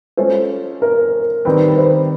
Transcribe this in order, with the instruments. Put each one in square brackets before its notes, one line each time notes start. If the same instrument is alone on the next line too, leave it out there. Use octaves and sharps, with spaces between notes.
[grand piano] G#3 C#4 F4 A4 [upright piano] C5
[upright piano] A#4
[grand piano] D#3 G3 C4 [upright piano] B4
[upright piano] B4
C5